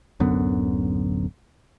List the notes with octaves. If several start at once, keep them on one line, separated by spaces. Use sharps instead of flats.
D1 F#2 D3 B3